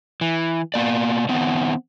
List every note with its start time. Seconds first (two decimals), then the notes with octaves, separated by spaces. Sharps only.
0.21 E3
0.74 B2 A#3 D5
1.29 D#3 B3 C4